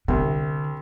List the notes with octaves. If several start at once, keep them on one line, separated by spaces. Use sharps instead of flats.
C2 D3